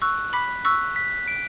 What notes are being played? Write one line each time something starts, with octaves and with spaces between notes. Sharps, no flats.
C#6 E6 F#6
B5 D6 B6
C#6 E6 F#6
B6
D7